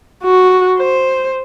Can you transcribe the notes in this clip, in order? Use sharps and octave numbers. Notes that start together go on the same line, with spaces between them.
F#4
C5